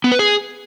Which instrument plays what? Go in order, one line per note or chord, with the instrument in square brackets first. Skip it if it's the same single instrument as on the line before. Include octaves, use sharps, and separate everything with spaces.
[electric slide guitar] B3
B4
G#4